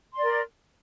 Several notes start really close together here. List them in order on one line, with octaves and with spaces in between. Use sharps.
C6 D5 A#4